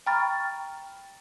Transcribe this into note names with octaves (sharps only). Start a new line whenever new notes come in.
G5 A#5 B5 C#6 F6 A6